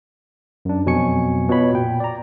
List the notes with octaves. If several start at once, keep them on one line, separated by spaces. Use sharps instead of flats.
F#2 D4
F2 B2 F#3 G#5 C#6 C#7
B2 B3 F4 C#5 B5
A#2 G5
D5 A#5